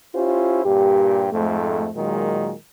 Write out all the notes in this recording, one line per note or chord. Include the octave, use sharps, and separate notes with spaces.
C#4 E4 F4 G4 C5
G2 A#2 G4
F2 G#2 A3
A#2 D#3 F#3 G#3